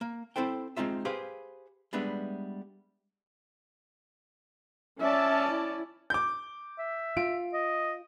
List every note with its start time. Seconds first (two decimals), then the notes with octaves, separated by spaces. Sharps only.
0.01 A#3
0.36 C4 E4 A4 C5 G5
0.77 G#3 C4 D#4 F4 E5
1.05 G4 G#4 B4 C5 F5
1.93 G3 G#3 B3 D4 B4 E5
5.00 C#4 D5 E5 A5
5.49 E4
6.10 D6 G6
6.79 E5
7.17 F4 D7
7.53 D#5